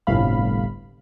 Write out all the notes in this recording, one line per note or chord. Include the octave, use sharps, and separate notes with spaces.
G1 C2 A2 F5 B5